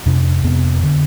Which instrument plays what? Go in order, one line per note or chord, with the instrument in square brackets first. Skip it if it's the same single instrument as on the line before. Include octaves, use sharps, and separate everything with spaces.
[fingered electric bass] F2 C3 D4
F2 C3 B3
D3